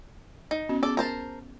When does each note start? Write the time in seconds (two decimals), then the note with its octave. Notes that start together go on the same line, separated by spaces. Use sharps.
0.51 D#4
0.69 B3 C#4 F#4
0.83 B3 G#4 A4 D5
0.97 A#4 C5 A5